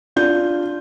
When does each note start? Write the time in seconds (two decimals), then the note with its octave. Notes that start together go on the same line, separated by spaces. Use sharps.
0.16 D4 F4 G6